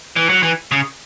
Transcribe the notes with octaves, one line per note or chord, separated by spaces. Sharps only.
E3
F#3
E3
C#3